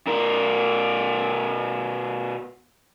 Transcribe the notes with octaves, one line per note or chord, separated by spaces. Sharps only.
B2 A#4